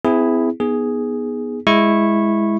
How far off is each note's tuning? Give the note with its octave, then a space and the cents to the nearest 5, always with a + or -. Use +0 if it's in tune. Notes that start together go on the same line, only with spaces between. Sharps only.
C4 -45 E4 +0 G#4 +0
B3 -15 D#4 +0 G#4 +0
G#3 +0 E4 +0 C#6 -15